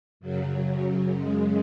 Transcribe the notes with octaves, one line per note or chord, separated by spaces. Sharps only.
F#2 C#3 F#3
F#2 C#3 G#3